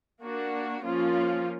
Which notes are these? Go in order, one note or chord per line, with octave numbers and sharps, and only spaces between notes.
A#3 D4 F#4
F3 A#3 C#4 F4